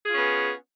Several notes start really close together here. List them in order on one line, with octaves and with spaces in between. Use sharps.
G#4 F4 C#4 B3